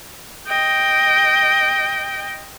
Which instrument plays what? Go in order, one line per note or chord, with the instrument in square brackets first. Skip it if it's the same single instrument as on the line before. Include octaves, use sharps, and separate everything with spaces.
[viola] D#5 G5